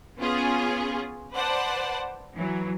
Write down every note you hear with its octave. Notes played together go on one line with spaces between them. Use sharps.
B3 C#4 F4 G#4
B4 C5 D5 F#5 A5
E3 F#3